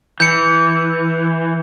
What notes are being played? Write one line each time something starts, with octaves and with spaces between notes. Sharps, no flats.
E3 G6 C#7